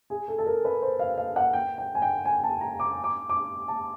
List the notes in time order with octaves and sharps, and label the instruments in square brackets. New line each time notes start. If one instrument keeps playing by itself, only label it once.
[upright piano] G#4
A4
A4
A#4
B4
C5
F5
F5
F#5
G5
G5
G#5
G5
G#5
A5
A#5
D6
D6
D6
A5